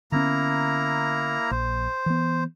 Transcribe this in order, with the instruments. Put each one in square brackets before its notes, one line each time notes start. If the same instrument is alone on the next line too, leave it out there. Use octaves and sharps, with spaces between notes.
[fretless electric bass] D3 B3 C#4 [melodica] A#3 E4 A#5
[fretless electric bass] A#1 [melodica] C5
[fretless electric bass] E3 B3